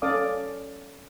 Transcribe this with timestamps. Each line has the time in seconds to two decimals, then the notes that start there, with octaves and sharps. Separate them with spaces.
0.02 C#4 A4 D5 F5 D6 D#6